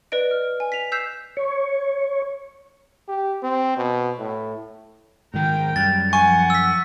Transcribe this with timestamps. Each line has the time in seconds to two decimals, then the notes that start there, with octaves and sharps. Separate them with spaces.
0.12 B4 D5 D#5 D7
0.31 F6
0.60 G#5
0.72 B6 F7
0.92 E6 F#6 G6 B6 C7 E7
1.37 C#5
3.08 G4
3.43 C4
3.77 B2
4.18 A2
5.34 G#2 D#3 A#4 G5
5.76 F#2 G3 A6
6.13 F3 F#5 G#5 C#6
6.50 E6 B6